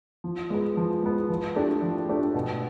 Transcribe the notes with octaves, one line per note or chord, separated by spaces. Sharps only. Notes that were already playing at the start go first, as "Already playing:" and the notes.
F3
G#3 B3
F3
G#3 B3
F3
A3 D4 G4
F3
A3 D4 G4
B2